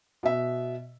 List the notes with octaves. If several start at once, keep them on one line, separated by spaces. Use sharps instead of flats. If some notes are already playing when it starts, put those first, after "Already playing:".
B2 E5